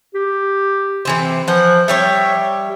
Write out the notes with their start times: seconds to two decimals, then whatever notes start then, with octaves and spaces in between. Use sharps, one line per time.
0.15 G4
1.05 C3 E3 C4
1.48 E3 F3 F#5
1.88 G3 G4 C#5 E5